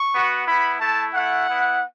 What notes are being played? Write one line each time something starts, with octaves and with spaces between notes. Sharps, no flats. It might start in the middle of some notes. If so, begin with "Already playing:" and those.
Already playing: C#6
B3 F#4
B3 E4 B5
A3 E4 A5
A3 E4 F#5
B3 E4